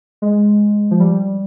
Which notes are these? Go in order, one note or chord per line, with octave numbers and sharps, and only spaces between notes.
G#3
F3
G3